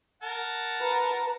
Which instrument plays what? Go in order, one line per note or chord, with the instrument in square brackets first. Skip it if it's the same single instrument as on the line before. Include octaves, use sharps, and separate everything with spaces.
[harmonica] A#4 F#5 A5
[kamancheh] B4 A#5